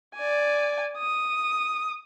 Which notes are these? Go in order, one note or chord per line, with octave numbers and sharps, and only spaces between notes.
D5 G#5
D#6